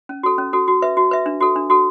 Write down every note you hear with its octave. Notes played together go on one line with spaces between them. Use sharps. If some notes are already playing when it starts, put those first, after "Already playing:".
C#4
F#4 A4
C#4
F#4 A4
F#4
B4 E5
F#4
B4 E5
D4
F#4 A4
D4
F#4 A4